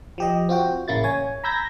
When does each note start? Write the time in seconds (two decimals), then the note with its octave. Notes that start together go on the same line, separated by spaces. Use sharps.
0.18 F3 G4 D#5
0.49 C4 F4 F#4 G5
0.88 A1 C#3 A#3 E4 A6
1.04 C#5 G#5
1.44 A#5 B5 E6 G6 G#6 A#6